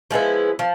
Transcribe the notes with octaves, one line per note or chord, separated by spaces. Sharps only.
F3 G#3 B3 E4
F3